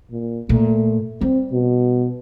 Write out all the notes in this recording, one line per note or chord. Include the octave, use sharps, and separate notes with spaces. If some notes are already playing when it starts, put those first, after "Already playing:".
A#2
A#2 A3
G3 C4
B2